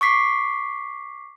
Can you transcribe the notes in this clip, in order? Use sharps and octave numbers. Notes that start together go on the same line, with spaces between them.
C#6 D6 B6 C7